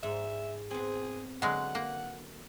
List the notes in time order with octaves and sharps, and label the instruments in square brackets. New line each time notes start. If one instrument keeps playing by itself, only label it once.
[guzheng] G#2 [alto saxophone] E5
[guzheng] B3 C4 [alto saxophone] G#4
[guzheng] D3 B4 C6 [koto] F#3 G#3 [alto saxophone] F#5
[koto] A#3